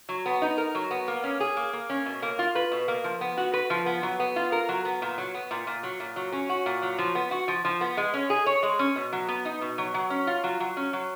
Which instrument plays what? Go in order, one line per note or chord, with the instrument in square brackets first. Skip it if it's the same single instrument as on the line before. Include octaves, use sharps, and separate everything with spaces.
[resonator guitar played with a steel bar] F#3
B3
D#4
A#4
F#3
B3
A#3
C#4
G#4
A#3
A#3
C#4
B2
A#3
F4
B4
B2
A#3
F3
B3
F#4
B4
F3
B3
F#3
B3
F4
A#4
F#3
B3
A#2
F#3
B3
A#2
A#2
F#3
A#2
F#3
C#4
F#4
A#2
F#3
F3
B3
F#4
F3
F3
B3
G#3
C#4
G#4
C#5
G#3
C#4
B2
F#3
B3
D#4
B2
F#3
F#3
C#4
F4
F#3
F#3
C#4
F#3